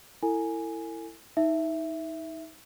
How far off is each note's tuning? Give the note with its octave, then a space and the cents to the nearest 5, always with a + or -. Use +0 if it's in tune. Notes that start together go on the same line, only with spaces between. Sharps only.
E4 +10 A4 +40 G#5 +0
D#4 +30 E5 +5